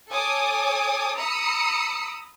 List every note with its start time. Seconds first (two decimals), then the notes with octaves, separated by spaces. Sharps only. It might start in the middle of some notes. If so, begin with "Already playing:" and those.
0.11 A4 C#5 G#5 D6 D#6
1.17 A#5 B5 D#6 E6 C#7